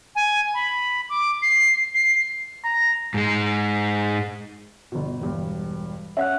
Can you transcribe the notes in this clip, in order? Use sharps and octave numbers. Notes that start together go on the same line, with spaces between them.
G#5
B5
D6
C7
C7
A#5
G#2 G#3
G1 B2
E1 G2
C#4 E5 F#5 F#6